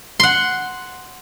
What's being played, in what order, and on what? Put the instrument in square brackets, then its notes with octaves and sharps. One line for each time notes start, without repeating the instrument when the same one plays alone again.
[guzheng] F#5 C6